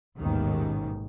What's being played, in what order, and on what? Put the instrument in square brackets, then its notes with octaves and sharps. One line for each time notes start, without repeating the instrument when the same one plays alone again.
[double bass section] A1 D#2 G#2 B2 D#3